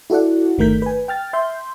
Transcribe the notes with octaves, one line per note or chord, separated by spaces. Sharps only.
E4 F#4 A4 D5 F#5
G1 D#3 A3 A#4 G6 B6
B4 G#5
G5 F6 A6
E5 C6 G6